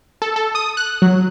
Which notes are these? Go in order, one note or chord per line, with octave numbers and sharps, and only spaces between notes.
A4
A4
D#6
F#6
F#3